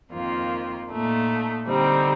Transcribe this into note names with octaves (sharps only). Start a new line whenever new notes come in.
F2 D#3 A#3 F4
A#2 A3 D#4
D3 G3 C4 D#4